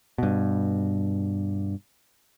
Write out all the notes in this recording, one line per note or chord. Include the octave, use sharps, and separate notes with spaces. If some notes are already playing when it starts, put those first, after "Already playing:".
G2 B2